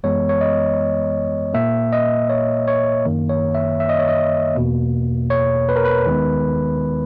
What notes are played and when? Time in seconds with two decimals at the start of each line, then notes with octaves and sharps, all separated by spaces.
0.04 F#2 E3 G#3 B3 C#5
0.29 C#5
0.41 D#5
1.54 A#2 A#3 E5
1.92 D#5
2.30 C#5
2.68 C#5
3.05 F#2 D#3 A#3
3.29 C#5
3.55 E5
3.80 E5
3.89 D#5
3.99 C#5
4.09 D#5
4.55 E2 B2 A#3
5.30 C#5
5.69 B4
5.76 A#4
5.85 B4
6.06 D#2 D#3 G#3 B3